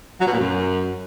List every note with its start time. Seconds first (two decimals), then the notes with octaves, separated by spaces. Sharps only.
0.21 F#3
0.27 B2
0.33 A#2
0.39 F#2